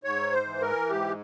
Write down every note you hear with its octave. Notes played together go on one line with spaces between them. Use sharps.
G#2 C#5
C5
E3
A#4
G#2 G4